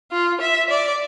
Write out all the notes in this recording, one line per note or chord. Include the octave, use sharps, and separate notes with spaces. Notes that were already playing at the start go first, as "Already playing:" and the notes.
F4
E5
D5